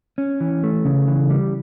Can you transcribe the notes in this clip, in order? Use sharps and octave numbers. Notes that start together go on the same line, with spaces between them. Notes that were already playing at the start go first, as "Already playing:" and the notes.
C#4
E3
A3
C#3
E3
G3